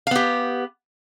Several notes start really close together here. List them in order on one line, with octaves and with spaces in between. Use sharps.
F5 B3 G4